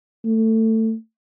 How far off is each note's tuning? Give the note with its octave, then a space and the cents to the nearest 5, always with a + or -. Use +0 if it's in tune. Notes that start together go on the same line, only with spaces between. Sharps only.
A3 +20